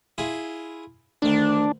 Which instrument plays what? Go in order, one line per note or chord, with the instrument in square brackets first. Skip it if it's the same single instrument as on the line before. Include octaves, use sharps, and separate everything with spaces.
[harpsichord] E4 F4 G#4
[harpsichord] D2 D#3 [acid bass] D4